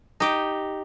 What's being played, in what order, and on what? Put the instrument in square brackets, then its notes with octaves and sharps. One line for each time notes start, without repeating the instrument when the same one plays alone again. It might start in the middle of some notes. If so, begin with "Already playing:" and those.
[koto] D#4 G4